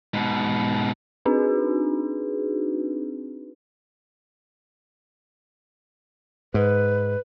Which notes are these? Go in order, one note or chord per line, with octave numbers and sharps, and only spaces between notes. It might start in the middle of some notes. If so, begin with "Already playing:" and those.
G#2 B2
C4 D4 D#4 F#4 G#4 B4
G#2 B4